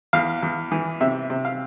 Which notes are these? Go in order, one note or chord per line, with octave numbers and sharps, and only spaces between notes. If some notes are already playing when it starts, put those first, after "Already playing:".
E2 F5
E2
E3
C3 E5
C3
F5